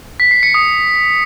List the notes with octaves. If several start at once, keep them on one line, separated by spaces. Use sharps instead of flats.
B6
C7
C#7
D#6